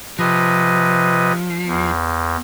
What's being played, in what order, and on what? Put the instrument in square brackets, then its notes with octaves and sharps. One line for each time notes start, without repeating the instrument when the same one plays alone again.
[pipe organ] C3 B4 D#5 [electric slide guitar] F3
[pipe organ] E2